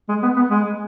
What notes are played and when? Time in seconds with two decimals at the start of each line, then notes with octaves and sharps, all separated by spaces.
0.08 G#3
0.23 B3
0.36 B3
0.50 G#3